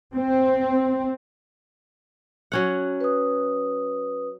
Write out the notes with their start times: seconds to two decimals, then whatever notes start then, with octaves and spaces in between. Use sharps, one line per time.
0.14 C4
2.52 F#3 C#4 F#5
3.01 B4 D#6